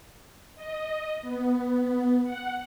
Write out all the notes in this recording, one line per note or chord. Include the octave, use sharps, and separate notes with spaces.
D#5
B3
F#5